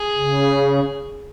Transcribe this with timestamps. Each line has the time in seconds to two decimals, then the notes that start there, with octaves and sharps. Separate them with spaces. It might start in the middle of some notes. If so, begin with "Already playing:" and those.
Already playing: G#4
0.15 C#3